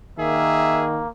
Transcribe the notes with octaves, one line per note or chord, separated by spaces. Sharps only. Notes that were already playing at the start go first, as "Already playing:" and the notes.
D#3 A#3 G#4 E5